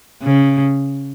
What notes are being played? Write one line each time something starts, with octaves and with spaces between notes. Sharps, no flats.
C#3